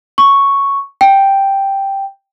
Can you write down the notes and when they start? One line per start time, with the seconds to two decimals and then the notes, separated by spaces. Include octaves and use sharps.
0.18 C#6
1.01 G5